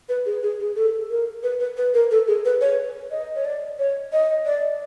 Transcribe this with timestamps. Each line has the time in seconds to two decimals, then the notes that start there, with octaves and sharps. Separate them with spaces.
0.09 B4
0.26 G#4
0.43 G#4
0.60 G#4
0.76 A4
1.10 A#4
1.43 B4
1.60 B4
1.77 B4
1.94 A#4
2.11 A4
2.27 G#4
2.45 B4
2.61 C#5
3.11 D#5
3.36 C#5
3.45 D5
3.79 C#5
4.12 D#5
4.46 D5